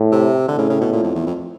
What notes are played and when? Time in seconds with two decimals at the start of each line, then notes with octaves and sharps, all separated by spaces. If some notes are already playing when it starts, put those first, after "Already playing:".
Already playing: A2
0.12 C3
0.48 D3
0.58 A2 C#3
0.69 C#3
0.81 B2
0.92 A#2
1.03 F2
1.15 E2
1.27 F2